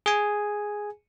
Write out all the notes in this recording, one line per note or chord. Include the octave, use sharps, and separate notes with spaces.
G#4 G#5